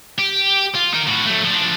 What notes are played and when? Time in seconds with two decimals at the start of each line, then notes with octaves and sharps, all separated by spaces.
0.18 G4
0.75 F4
0.94 D#4 A#4
1.07 A2 F#4
1.26 F#3 A3
1.44 F3 D4